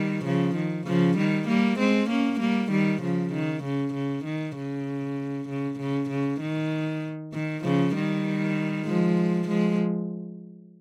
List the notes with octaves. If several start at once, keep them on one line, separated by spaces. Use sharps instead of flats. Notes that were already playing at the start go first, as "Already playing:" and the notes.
Already playing: D#3 G3
C#3 F3
D#3
C#3 F3
D#3 G3
G3 A#3
G#3 C4
A#3 C#4
G3 A#3
D#3 G3
C#3 F3
D#3
C#3
C#3
D#3
C#3
C#3
C#3
C#3
D#3
D#3
C#3 F3
D#3 G3
F3 G#3
F3 G#3